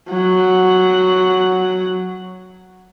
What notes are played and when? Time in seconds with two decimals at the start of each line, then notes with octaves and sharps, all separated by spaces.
0.10 F#3 F#5